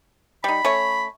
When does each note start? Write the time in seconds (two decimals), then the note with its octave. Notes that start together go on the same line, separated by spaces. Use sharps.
0.44 G3 D#4 B5
0.65 A3 C#4 C#5